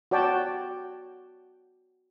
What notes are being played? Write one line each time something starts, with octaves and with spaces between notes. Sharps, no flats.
F#4 C#5 D5 G5 A5